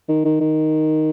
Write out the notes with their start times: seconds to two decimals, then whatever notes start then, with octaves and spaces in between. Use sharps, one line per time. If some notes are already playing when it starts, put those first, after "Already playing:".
0.09 D#3
0.25 D#3
0.41 D#3